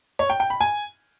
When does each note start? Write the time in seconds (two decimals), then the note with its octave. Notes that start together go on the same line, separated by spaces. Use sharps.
0.19 C#5
0.30 G5
0.40 G5
0.50 B5
0.61 G#5